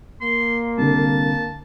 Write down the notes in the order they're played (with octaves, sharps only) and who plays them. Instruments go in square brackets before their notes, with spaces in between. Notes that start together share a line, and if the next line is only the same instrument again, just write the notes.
[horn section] A#3 [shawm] C6
[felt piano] C2 D3 [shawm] A5